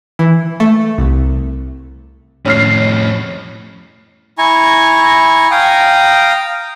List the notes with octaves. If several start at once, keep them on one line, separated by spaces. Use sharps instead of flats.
E3
A3
C2
F2 A2 C#4 F6 C7
E4 G#5 A#5 C#6
F5 G5 A#5 D#6